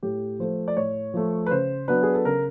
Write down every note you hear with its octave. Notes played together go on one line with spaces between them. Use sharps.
A2 G4
F3 A3 C5
D5
A2 C#5
F3 A3
B4
C#3 C5
F#3 B3 D4 B4
G#4
A4
C#3 A#4